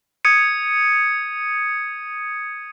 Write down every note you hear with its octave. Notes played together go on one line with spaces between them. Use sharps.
D#6 G#6 C#7 D#7